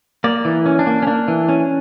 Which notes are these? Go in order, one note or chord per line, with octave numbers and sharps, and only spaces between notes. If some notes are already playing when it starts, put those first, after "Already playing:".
A#3 D5
E3
C#4
D4
A#3
C#4
A#3 D4
E3
C#4